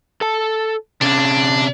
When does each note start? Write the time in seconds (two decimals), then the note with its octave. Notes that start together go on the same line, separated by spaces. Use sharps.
0.21 A4 A5
1.01 C3 C#4 D4